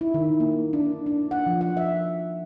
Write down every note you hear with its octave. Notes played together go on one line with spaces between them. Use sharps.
E4
D#3
A#3
D4
D4
F#5
F3
F#5
E5